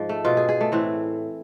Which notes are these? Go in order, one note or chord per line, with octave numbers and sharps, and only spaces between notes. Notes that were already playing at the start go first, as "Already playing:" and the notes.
Already playing: G#2 F3
A3
B2 F4
G#4
G#4
A3
A2 E3 C4